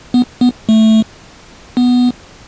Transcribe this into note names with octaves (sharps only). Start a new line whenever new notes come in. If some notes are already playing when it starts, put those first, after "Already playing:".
B3
B3
A3
B3